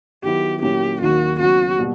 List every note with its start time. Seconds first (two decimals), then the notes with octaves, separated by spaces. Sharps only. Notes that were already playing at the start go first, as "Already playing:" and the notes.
0.23 D#3 F#3 B3 E4 G4
0.62 A#2 F#3 A#3 C#4 E4 G4
1.01 D#2 D#3 F#3 A#3 F#4
1.40 C#3 F#3 B3 F#4
1.79 B2 G3 A#3